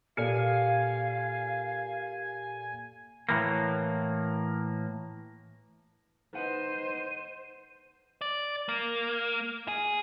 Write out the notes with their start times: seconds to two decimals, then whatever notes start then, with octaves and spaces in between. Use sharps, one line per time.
0.17 A#2 G4 A4 D5 F5 G#5 F6 C#7
3.29 A2 E3 A#3
6.35 D#4 B4 C5 F#5 D#7
8.22 D5
8.69 A#3
9.68 G#4